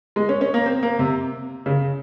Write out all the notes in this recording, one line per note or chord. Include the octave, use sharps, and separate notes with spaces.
G#3
C#4
C#4
A#3
C4
A#3
C3
C#3